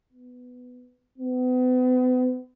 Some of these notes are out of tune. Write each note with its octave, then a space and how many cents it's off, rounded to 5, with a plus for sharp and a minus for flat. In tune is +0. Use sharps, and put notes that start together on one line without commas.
B3 +10
B3 +40